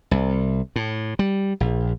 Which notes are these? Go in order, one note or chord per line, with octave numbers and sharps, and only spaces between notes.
C2
A2
G3
A#1